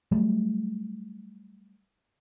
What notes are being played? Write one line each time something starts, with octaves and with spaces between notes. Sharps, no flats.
F#3 G3 A3